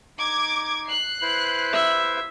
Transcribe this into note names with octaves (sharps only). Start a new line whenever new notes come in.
D#4 D6 G#6
F#6 C7
E4 B4 C5
E5